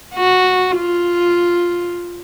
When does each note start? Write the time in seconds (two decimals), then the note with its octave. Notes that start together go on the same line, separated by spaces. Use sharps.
0.15 F#4
0.78 F4